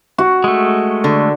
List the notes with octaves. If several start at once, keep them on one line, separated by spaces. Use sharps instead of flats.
F#4
G#3 A3
D3